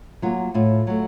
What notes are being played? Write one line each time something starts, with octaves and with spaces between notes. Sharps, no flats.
F#3 A#3 F4
A2 F4
F#3 A3